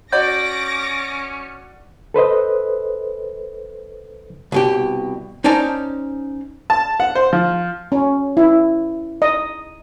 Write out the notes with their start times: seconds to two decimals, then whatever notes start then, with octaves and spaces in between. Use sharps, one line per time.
0.12 C#4 F#4 D5 D6 G6 A#6
2.14 A4 B4 C5 D#5
4.52 C2 B2 G4
5.44 C#4 D#4 C5 D5 A5 A#5
6.70 A5
7.00 F#5
7.15 C5
7.33 F3
7.92 C#4
8.37 E4
9.22 D#5